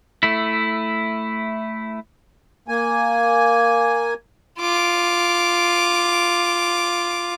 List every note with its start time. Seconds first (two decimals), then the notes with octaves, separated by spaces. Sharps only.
0.23 A3 E4
2.68 A#3 G#5
4.59 F4 D6